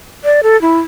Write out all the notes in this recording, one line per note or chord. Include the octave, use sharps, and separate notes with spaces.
D5
A4
E4